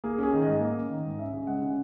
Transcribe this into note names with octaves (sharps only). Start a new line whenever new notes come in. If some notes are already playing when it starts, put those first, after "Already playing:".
A#3 G#4
C#4 G#4
D#3
G#2 D#5
A#3
C#4
D#3
G#2
C#4 E5
C#3
G#3 F#5
C#3